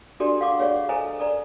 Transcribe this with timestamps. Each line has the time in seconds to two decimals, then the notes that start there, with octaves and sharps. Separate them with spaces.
0.20 D4 F#4 G4 A4 D5 C6
0.41 F5 F#5 C#6 D6
0.59 G#4 C#5 D5 F5 F#5 C#6
0.89 A4 C5 D#5 G#5 A#5
1.19 A4 D5 A#5